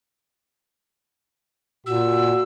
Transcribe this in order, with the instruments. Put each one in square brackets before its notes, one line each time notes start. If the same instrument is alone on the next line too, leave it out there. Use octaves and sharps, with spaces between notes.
[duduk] A#2 [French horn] F#4 [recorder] E6